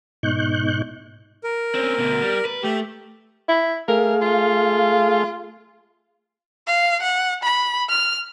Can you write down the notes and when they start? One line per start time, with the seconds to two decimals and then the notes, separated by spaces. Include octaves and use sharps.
0.23 G#2 B2 D#4 C#6 F#6 G6
1.44 A#4
1.75 C4 C#4
1.98 D2 B2
2.22 G3
2.45 B4
2.63 A3 G4
3.49 E4
3.88 A3 G#4 A#4 F5
4.22 F4
6.67 F5
7.02 F#5
7.43 B5
7.89 F6